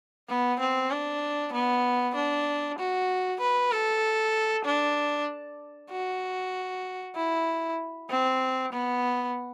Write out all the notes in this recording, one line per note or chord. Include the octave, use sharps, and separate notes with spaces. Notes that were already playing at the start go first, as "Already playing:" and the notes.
B3
C4
D4
B3
D4
F#4
B4
A4
D4
F#4
E4
C4
B3